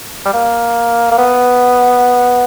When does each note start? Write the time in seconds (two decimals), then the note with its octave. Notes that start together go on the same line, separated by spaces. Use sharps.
0.26 G3
0.33 A#3
1.11 A#3
1.18 B3